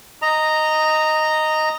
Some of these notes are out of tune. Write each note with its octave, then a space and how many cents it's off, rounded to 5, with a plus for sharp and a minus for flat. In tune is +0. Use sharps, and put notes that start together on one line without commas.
D#5 +0 A#5 -10